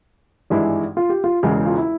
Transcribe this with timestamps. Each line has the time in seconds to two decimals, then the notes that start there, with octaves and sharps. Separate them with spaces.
0.50 G#1 G2 E3 G#3 E4
0.97 F4
1.09 G4
1.24 F4
1.43 E1 E2 C#3 E3 G#3 E4
1.66 F4
1.78 E4